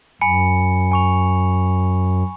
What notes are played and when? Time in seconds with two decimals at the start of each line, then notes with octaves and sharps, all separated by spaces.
0.21 F#2 G#5 B5 C#7
0.92 G#5 C#6 F7